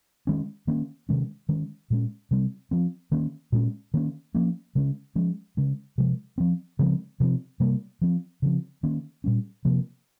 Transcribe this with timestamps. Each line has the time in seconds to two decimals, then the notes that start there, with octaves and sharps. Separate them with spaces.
0.27 D#3 G#3 C#4
0.67 D#3 A#3 C#4
1.09 C3 D#3 G#3 C#4
1.49 D#3 G#3 C#4
1.90 A#2 G#3 C#4
2.31 C3 G3 C4
2.71 F3 C4
3.12 D#3 A#3 C#4
3.52 A#2 G#3 C#4
3.94 D#3 A#3 C#4
4.35 F3 A#3 C#4
4.75 C#3 G#3 C#4
5.15 F3 G#3 C#4
5.57 C#3 G#3 C#4
5.98 C3 F3 G#3
6.38 F3 C4
6.79 C#3 F3 G#3 C4
7.20 C3 F3 C4
7.60 C3 G3 A#3
8.01 F3 C4
8.42 C#3 F3 C4
8.83 D#3 A#3 C#4
9.24 A#2 G3 C#4
9.65 C3 F3 A#3